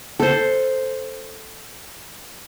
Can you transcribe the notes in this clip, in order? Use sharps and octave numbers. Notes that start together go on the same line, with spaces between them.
A4 C5